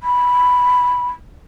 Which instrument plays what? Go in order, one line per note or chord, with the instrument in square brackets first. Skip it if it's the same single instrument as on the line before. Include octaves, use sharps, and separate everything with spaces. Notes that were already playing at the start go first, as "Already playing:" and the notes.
[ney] B5